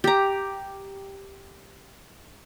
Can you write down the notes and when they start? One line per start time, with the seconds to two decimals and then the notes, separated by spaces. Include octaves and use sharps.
0.04 G4 A#5